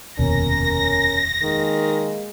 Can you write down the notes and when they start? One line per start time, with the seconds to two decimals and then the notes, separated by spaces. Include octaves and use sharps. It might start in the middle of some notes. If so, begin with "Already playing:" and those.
0.19 F1 D#2 B2 C#4 A#4 A#6
1.41 D#3 G#3 A#3